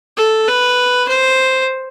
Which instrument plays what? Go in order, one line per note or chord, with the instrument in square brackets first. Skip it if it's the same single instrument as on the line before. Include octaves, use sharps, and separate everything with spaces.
[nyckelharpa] A4
B4
C5